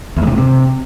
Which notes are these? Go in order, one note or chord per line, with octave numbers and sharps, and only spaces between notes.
E2
G#2
C3
A2
C3